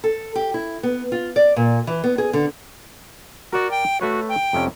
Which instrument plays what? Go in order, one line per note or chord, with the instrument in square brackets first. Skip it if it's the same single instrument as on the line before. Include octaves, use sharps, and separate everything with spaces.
[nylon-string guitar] A4
G4
E4
B3
F4
D5
A#2
E3
B3
G#4
D3
[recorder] F#4 [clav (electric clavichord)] A#4 D5
[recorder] G5
[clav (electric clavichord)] A3 B4 C#5 [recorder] F#4
[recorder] G5
[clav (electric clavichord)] F2 C3 C#4